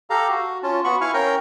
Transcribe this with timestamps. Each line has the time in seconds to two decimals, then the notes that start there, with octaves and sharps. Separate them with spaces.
0.10 G4 A4 F5 A#5
0.30 F#4
0.63 C#4 F4 A5
0.84 B3 F#4 B5 C#6
1.01 E4 F5 G#5 C#6 F6
1.14 C#4 A#4 G5 A#5